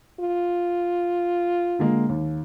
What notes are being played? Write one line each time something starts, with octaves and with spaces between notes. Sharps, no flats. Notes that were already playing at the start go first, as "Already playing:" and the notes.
F4
D3 G#3 A#3
D#2